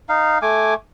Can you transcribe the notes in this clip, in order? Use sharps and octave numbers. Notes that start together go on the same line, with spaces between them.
D#4 F5
A3 G#5 D6